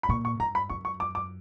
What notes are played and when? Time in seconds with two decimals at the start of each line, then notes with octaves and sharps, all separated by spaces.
0.03 B5
0.09 A#2 C#6
0.25 C#6
0.40 G2 A#5
0.55 B5
0.70 F#2 C#6
0.85 C#6
1.00 D6
1.15 D6